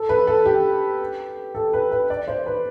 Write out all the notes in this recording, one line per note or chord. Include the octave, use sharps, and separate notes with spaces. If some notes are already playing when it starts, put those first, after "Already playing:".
Already playing: A4
B4
A4
G4
A4
B4
B4
D5
C5
B4